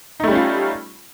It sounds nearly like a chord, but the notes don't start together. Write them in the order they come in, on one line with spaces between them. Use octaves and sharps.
D#4 A3 G3 C#4 F4